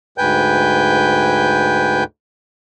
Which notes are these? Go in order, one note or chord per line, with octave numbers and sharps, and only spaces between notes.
D2 G#2 B4 G5 G#5 G6